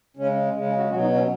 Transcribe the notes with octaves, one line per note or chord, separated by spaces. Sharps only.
C#3 G#3 C#4
C#3 G#3
C#4
F#4
B2 F#3 F#4
D#4
C#4